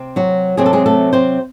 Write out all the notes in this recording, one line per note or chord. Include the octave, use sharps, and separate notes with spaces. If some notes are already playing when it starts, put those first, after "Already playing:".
Already playing: C3 C4
F#3 F#4
C3 F#3 C4 G#4
A4
G#3 G#4
A3 A4
C4 C5